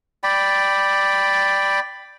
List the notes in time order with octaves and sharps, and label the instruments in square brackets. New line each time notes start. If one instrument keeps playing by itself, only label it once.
[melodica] D5 G5 B5